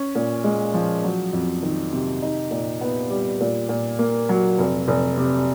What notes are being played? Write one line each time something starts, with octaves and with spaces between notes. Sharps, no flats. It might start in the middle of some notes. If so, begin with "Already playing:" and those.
Already playing: C#4
A#2
G#3
F3
F#3
F2
D#3
C3
D#4
A#2
B3
G3
A#2
A#2
A#3
F#3
F1
F1
C3